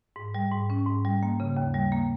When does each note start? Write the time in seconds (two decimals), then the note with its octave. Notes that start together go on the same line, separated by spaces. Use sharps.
0.16 G#2
0.35 G3
0.51 G#2
0.70 C#4
0.86 G#2
1.05 G3
1.23 A#3
1.40 C#3
1.57 D#2
1.74 G3
1.92 A#3